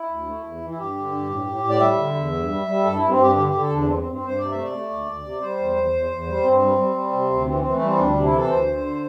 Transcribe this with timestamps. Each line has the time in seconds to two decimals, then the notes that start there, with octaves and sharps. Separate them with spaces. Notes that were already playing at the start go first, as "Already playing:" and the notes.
Already playing: E4
0.09 D2
0.26 A3
0.44 E2
0.61 E3
0.70 E4
0.78 G2 G4
0.95 D3
1.12 G2
1.29 A2
1.46 A2
1.64 A2
1.70 D5
1.80 G3 E5
1.98 D3
2.15 E2
2.32 G2
2.49 G3
2.67 G3
2.84 G2 A4
2.96 G2 E4
3.09 C4
3.18 G2 G4
3.35 D3 G4
3.48 D3 G4
3.61 A4
3.69 E2 D4
3.86 G2 C4
3.99 C4
4.04 G2
4.12 C4
4.21 G2 C5
4.38 C3 D5
4.51 A3 E5
4.63 D5
4.72 A3
4.90 D2
5.06 D2
5.23 C3
5.41 G3 C5
5.59 E2
5.76 E2
5.93 E2
6.10 E2
6.27 G3
6.44 G2 C4
6.61 G3
6.78 G3
6.96 G3
7.13 C3
7.30 D2
7.47 E3 C4
7.60 E3 C4
7.73 A3
7.81 G3 C4
7.98 D2 D4
8.11 C3 D4
8.24 E4
8.32 E3 A4
8.50 D2 C5
8.67 D3